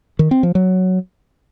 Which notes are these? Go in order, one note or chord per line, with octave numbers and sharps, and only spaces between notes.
D#3
C4
F3
F#3